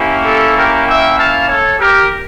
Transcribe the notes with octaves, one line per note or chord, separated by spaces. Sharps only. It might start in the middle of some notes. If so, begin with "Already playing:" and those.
Already playing: A#3 C#4 E4 G4
A4
G4 A#4
E5 G5
F5 A5
A4 C#5
G4 A#4